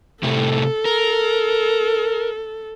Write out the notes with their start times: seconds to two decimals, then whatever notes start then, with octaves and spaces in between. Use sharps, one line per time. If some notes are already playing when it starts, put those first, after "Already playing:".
0.23 A2 C3 A3 A4
0.85 A#4